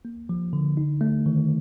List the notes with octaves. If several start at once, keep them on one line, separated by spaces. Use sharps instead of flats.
A#3
F3
D3
D#4
A3
D#3